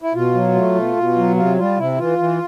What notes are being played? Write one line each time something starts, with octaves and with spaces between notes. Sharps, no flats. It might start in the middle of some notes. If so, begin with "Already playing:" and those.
E4
B2 F4
F#3
A3
B2
B2
F#3
C3 F4
G3 F4
C3 E4
E3 F4
E3